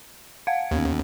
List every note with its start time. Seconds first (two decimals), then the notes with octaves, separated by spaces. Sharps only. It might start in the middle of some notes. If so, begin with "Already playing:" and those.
0.47 F5 F#5 G#6
0.71 D#2 B3 C#4